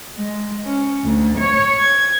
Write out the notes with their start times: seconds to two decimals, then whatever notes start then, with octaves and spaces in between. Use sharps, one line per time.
0.17 G#3
0.66 C#4
1.04 D2
1.39 C#5
1.79 G#6